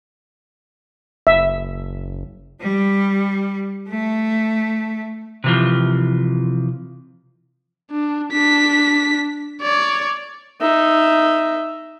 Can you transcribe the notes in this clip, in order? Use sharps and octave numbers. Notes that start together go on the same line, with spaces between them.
F#1 E5
G3
A3
C3 E3 F3
D4
D4 B6
C#5 D5
D#4 E5